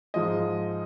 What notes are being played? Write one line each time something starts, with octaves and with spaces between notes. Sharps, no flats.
G#2 F3 G#3 D#5